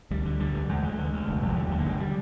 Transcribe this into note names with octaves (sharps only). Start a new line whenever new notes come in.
D2 G3
D3
D3 G3
D2
D2 G#3
D3
D3
D2
F1
F1 F3
D#2 G3
D3
A#3
F1 G#3
G3